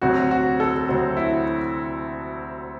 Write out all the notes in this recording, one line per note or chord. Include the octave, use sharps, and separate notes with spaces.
D2 C3 F#3 C4 F#4
F#4
A4
D2 C3 F#3 C4 F#4
E4